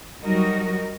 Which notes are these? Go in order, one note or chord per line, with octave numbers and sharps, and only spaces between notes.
F#3 G3 D#4 F#4 A#4 D#5